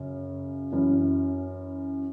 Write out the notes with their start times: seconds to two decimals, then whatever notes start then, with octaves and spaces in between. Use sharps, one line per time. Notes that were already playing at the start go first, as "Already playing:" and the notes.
Already playing: F#2 C#3
0.72 F#2 E3